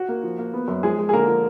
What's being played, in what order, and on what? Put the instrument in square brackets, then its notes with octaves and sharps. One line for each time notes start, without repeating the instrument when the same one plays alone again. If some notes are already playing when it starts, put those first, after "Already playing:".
Already playing: [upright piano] F#4
A#3
F3
A#3
B3
F#2
F3 G#3 G#4
G#3
G#4
D3 A#3 A#4
F3